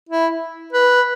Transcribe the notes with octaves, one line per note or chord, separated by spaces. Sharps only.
E4
B4